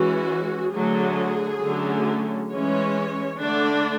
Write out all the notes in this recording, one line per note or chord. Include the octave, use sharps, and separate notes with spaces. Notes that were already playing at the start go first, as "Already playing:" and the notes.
Already playing: E3 G#3 C#4 F#4
D3 F#3 A3 G#4
D3 F#3 A3 C#4
E3 G#3 C#4 C#5
D3 A3 D4 D5